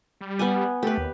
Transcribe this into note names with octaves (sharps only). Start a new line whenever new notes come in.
G3
B3 F#5 G#5
A3 G4 B4
D#2